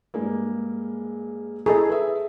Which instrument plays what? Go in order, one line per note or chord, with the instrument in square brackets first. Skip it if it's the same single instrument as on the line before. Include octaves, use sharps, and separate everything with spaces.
[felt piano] G2 G#3 A#3
[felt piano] E4 [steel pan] G#4 A4 D#5
[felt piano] B4 E5